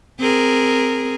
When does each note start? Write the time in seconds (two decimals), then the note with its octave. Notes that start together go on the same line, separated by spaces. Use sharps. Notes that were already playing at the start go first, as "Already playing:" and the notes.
0.19 C4 G#4 A#4